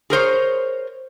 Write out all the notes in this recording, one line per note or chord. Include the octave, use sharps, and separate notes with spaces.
G#4 A#4 C5 C#5